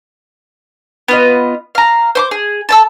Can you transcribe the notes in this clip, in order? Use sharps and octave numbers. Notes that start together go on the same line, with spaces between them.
B3 F4 D#5
F5 A#5
C5 C6 D6
G#4
A4 A5 E6